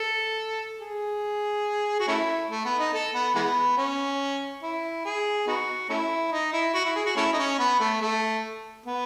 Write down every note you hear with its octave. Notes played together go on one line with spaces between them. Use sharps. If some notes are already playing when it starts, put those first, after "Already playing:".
Already playing: A4
G#4
F#4
A3 C#4 E4
A3
B3
D#4
A4
B3
E3 G#3 B3
C#4
E4
G#4
B3 D#4 F#4
A3 C#4 E4
D#4
E4
F#4
E4
G#4
F#4
A3 C#4 E4
D#4
C#4
B3
A3
A3
B3